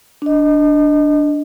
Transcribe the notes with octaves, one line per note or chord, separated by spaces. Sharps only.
D4 D#5